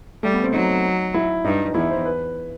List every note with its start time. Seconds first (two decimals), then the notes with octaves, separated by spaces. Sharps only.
0.23 G3 A3
0.34 B3
0.44 C4
0.53 F#3 D#4
1.14 E4
1.45 G2 D#4
1.75 E2 E4
1.90 C5
2.05 B4